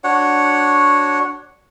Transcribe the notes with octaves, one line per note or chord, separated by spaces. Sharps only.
D4 F#4 C#5 F#5